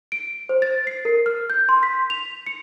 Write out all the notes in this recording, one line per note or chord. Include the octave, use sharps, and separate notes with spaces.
D7
C5
A6
C7
A#4
F6
G6
C6
B6
F7
C#7